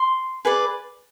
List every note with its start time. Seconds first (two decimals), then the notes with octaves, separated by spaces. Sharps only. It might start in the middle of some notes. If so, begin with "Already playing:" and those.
Already playing: C6
0.45 G#4 B4 D5